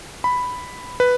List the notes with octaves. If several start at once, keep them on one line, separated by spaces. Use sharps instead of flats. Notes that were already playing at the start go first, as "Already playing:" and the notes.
B5
B4